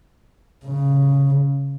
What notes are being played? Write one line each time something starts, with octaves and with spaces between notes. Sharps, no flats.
C#3